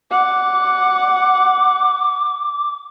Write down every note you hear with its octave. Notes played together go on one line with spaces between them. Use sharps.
F#5 D6